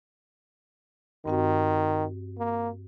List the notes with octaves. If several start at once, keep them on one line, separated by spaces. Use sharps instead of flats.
G2 D#3 C4 F#4
A#3